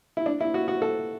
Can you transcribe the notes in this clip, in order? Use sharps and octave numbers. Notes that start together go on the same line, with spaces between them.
E4
D4
E4
F#4
F#4
A4